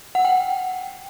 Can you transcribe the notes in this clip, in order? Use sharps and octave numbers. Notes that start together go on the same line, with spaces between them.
F#5
G5